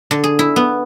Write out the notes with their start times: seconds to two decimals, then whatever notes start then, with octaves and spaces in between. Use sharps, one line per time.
0.11 D3
0.24 G#4
0.39 E4
0.56 B3